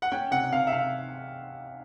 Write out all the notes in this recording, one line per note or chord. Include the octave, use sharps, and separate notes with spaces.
F#5
C#4 G5
C3 F#5
C3 F5
E5
C3 F5